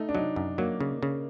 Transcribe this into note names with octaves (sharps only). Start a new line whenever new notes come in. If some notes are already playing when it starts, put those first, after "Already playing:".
Already playing: A3 D#4
D4
F#3 D#4
F#2
F#3 A#3
C#3
C#3